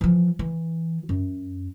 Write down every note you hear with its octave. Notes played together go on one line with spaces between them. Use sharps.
E3 F3
E3
F#2